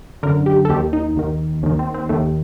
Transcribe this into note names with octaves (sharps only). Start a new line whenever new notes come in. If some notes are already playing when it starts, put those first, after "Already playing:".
F#2 D3 A#4
G4
A4
D#2 D#3 G4
D#4
D#2 D#3
D#2 D#3
C4
C4
D#2 D#3 A3